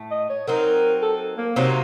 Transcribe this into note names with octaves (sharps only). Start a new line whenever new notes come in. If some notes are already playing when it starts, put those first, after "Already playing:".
Already playing: A2 A3
D#5
C#5
F#3 C4 D#4 A#4
A4
A#3
C3 F#3 A#3 C4 D#4